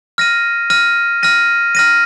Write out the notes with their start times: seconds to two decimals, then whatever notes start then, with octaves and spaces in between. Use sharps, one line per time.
0.18 F6 A#6 D#7
0.70 F6 A#6 D#7
1.23 F6 A#6 D#7
1.75 F6 A#6 D#7